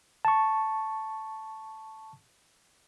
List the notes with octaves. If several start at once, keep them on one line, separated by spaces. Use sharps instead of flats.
A5 C#6